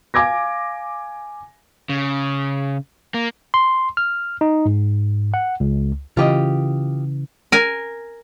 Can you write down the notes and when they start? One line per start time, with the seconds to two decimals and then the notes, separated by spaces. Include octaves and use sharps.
0.14 F5 G#5 D6 G#6 A#6
1.89 C#3
3.14 A#3
3.54 C6
3.97 F6
4.41 D#4
4.66 G#2
5.34 F#5
5.60 C#2
6.17 C#3 E3 F4 G4 D#5
7.52 A#4 G#5